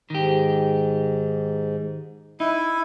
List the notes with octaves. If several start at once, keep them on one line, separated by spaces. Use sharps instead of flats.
G#2 D#3 G4
D#4 E4